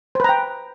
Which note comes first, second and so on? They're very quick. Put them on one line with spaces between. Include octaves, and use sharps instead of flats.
C5 B4 A#5 G5